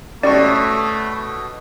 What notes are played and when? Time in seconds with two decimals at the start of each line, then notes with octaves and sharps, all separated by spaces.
0.23 B2 A3 C#4 G4 D5 C#6